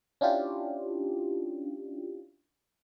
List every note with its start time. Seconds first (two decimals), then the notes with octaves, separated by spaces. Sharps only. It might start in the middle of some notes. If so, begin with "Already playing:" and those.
0.21 C#4 D4 E4 F4 G4